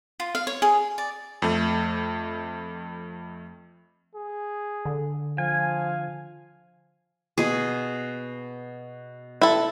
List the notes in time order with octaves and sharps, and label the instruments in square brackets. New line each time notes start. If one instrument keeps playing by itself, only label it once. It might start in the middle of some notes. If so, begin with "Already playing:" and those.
[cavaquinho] F4
F5
C#5
G#4
D5
[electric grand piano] F2 A3
[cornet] G#4
[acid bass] D3
[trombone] F3 [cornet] F5 [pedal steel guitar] G#5
[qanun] B2 G#4
[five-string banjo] E4 A4